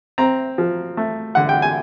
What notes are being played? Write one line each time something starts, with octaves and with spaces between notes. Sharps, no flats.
C4 A#5
F3
A3
D3 F#5
G5
G#5